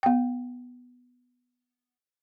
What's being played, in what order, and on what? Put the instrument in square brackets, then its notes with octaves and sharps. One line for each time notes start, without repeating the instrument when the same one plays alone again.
[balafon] B3 G5